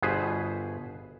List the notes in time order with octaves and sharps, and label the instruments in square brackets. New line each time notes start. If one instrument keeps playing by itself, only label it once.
[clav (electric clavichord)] G1 B2 G#4 B4 C5